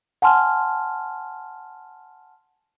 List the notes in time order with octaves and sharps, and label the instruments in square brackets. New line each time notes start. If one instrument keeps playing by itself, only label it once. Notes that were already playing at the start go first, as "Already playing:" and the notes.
[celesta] F#5 G#5 A5 C6 F6